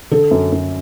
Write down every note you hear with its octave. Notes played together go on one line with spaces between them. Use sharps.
D3 A4
F#2
F#2